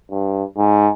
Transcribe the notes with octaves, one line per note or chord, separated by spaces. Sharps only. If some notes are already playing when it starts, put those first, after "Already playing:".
G2
G#2